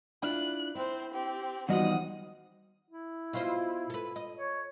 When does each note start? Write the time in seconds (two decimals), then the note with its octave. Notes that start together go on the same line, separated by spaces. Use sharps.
0.23 D4 E4 F4 F#6
0.75 C4 E4 C5
1.13 C4 G4
1.69 E2 D#3 F3 G3 F#4 D#5 F#5 D#6
2.90 E4
3.33 B2 F4 C5
3.90 A4 B4
4.16 D#5
4.37 C#5